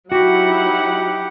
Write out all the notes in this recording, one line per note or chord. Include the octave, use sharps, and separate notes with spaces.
F#3 D#4 E4 F#4 G4 F#5